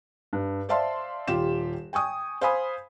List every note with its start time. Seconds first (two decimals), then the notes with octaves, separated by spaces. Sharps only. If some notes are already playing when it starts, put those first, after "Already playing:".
0.33 G2
0.69 C5 D5 E5 F5 A5 C6
1.27 D#1 F4 G4 E7
1.93 G5 G#5 C#6 D#6
2.41 C5 F5 G#5 B5 D#6